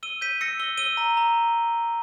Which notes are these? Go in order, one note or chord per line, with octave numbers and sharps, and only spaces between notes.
E6 D#7 G7
G6 B6 D#7
E6 A#6 C#7
E6 G7
E6 D#7 G7
A#5
A#5